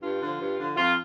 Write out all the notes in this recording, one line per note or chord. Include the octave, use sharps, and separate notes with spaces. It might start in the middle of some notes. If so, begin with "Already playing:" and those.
G2 F4
D3 F3
G2
D3 F3
F2 F4